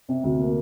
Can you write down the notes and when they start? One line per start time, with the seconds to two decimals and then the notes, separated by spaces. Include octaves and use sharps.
0.09 C3
0.24 D2
0.40 A#3